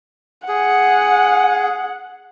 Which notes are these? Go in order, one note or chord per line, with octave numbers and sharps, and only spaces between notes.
G#4 F#5